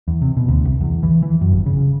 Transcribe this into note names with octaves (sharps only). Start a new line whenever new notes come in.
E2
C3
B2
D2
C2
E2
E3
E3
F#2
G1
C#3